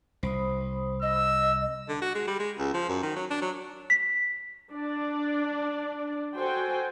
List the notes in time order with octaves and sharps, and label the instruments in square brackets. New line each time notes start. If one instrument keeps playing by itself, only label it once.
[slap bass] C2 [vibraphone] C5 B5 D#6
[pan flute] D#5 [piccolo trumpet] E6
[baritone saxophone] D3
F#4
G#3
G3
G#3
C#2
F3
F#2
D#3
F#3
D4
F#3
[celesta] B6
[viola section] D4 D5
F#4 A4 C5 G5 G#5